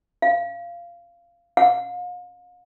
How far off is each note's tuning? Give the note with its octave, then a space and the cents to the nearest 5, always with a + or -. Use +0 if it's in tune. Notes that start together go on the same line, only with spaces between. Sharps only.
F5 -15
F5 +40